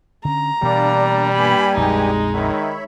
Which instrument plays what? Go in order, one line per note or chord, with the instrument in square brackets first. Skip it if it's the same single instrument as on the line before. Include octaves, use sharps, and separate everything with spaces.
[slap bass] D3 C#4 [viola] A#5
[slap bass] B2 E3 [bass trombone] G3 [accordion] A#3 D4 D5
[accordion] G2 G4 G#5 [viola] A#3 B5
[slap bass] A#1 F2 [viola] G#3 D#4
[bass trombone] D#3 [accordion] C#5 E5 B5